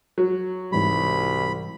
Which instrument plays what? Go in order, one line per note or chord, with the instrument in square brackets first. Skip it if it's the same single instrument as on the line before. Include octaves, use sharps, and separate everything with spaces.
[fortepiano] F#3
[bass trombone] C2 [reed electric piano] G#2 E3 G3 [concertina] B5